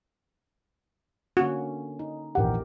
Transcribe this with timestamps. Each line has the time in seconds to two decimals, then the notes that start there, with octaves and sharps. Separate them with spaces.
1.37 D3 A#3 C#4 F#4
1.99 D#4
2.35 A#1 E2 G4 A#4 F#5